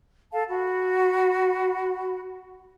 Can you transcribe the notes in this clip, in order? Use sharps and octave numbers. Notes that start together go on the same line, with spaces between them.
A4 F5 A5
F#4 B5